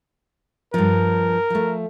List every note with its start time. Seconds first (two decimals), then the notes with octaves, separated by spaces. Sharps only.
0.74 G2 F3 A#4
1.50 F3 A3